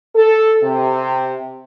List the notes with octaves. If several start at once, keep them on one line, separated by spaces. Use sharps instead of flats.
A4
C3